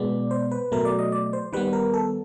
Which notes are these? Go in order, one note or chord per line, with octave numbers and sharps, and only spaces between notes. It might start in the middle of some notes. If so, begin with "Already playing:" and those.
Already playing: B2 G#3 B3 D5
C5
B4
B2 F#3 A3 A#4
D5
D#5
D5
C5
D#3 G3 B3 B4
A#4
A4